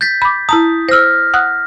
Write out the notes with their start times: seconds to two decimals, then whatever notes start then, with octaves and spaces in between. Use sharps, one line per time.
0.01 G6 A6 B6
0.22 B5 D6
0.49 E4 A5 A#5 D#6
0.89 C5 E6 F6 A#6
1.34 F#5 D#6 F#6